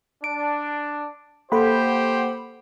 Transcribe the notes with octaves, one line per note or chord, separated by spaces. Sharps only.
D4 D7
A#3 G4 A4 C5 F#5 B5